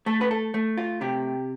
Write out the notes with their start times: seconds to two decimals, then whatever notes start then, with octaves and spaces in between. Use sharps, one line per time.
0.06 A3 A4
0.21 B4
0.31 A4
0.54 A3
0.77 F4
1.01 C3 G4